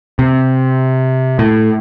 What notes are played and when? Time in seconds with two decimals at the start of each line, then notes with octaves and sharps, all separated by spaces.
0.19 C3
1.39 A2